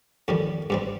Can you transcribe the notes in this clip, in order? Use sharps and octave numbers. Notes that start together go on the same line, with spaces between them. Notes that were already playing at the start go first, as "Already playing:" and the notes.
F2 D#3 G3
G2 G3 C4